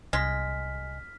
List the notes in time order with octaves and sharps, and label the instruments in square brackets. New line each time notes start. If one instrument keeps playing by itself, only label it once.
[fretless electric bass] C2 [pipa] G#3 [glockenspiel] F6 B6